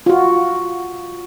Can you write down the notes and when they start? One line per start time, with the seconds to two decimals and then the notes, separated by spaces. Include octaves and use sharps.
0.06 F4 F#4